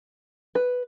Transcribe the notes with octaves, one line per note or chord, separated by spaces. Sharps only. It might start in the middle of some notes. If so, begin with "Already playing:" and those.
B4